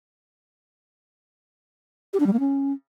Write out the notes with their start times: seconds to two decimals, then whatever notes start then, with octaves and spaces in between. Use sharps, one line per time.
2.13 G4
2.20 D4
2.27 G3
2.33 A#3
2.40 C#4